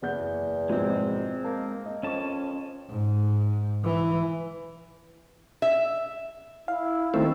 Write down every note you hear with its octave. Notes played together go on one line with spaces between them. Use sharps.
F#1 E2 F#5 G6
G#2 B2 F3 G#3 C4
A#3 A5
D#5
F2 C#4 D#5 A5 C#6
G#2
E3
E5
E4 F5
D#3 A3 C4 E6